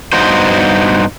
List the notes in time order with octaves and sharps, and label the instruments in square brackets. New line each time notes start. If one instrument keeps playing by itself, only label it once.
[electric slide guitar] G2 B3 D#4 F#4 C5